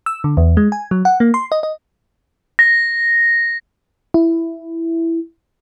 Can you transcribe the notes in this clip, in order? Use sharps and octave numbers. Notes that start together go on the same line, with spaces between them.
E6
D3
E2
G#3
G#5
F#3
F#5
A#3
C6
D#5
D#5
A#6
E4